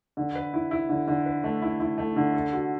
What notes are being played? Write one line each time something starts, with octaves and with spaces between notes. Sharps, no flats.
D3
B4
E4
E4
D3
D3
B4
A3
E4
E4
A3
D3
A4
F#4